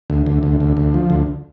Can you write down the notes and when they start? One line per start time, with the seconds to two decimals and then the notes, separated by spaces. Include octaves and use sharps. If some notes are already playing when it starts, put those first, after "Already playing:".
0.10 D2
0.26 D2
0.43 D2
0.60 D2
0.77 D2
0.94 F3
1.10 D2